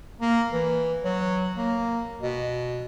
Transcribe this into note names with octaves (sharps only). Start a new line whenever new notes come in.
A#3
E3
F#3
A#3
B2